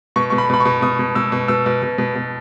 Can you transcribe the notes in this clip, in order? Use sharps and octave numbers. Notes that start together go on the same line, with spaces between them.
B2 C#6
B2 C#6
B5
B2 B5
C#6
B2
B2 D#6
B2
B2 E6
B2
B2 E6
B2
B2
B2
B2